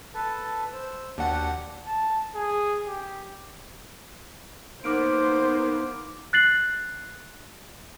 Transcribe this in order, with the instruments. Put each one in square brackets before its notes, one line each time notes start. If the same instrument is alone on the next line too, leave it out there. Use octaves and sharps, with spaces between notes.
[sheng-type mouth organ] A4 B4 A5
C5 E6
[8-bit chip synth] D#2 F#5 [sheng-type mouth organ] D4 F#4 G4
[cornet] A5
G#4
G4
[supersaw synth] A#3 B3 [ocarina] D#4 [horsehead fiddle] C5 [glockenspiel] D6 F6 D7
[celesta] F#6 A6 C7 F#7